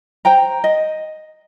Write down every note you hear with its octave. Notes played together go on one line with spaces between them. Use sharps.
C5 G5 A#5
D#5